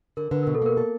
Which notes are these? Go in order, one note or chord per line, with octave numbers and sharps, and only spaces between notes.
D3 A#4
D3 B4
B2 A#4
A4
A#3 A#4
A4